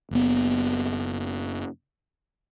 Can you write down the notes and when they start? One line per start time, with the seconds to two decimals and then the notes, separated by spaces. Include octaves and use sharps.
0.11 F#1 B3